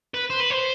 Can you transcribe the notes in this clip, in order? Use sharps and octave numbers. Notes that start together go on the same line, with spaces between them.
B4
C5
B4
C5